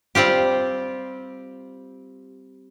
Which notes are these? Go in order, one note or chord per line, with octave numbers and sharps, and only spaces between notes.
G3 C4 F4 G4